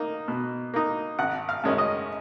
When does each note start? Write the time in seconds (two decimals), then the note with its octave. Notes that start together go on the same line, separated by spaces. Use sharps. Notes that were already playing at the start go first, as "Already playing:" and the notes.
Already playing: A#3 D#4
0.28 B2
0.74 A#3 D#4
1.19 G#1 F#5
1.49 F5
1.64 F#2 D#3 G#3 C#4
1.78 D#5